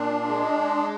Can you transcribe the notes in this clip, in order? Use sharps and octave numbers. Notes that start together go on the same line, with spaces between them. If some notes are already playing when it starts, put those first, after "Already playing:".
Already playing: A#2 D4
G#3